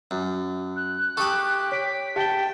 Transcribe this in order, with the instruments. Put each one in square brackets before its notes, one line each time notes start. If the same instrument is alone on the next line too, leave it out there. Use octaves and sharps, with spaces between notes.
[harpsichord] F#2
[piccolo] F#6
[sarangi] G4 [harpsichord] A4 B5 [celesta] C#6 D#6
[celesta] C#5 D7 [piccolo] B6
[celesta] G4 B6 G7 [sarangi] G5 [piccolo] A5